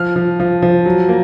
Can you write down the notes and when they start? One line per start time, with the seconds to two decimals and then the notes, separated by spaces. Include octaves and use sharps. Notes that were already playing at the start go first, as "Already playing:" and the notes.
Already playing: F3 F6
0.16 F3
0.40 F3
0.62 F3
0.86 F#3
1.09 A#3